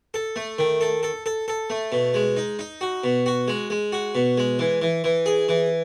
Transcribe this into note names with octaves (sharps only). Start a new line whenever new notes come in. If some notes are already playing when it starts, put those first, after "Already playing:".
A4
A3
D#3
A4
A4
A4
A4
A3
B2
G#3
D#4
D#4
F#4
B2
F#4
G#3
G#3
F#4
B2
G#3
E3
E3
E3
G#4
E3